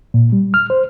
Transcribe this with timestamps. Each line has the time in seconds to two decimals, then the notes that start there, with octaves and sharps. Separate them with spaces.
0.14 A#2
0.33 G3
0.54 F6
0.70 C5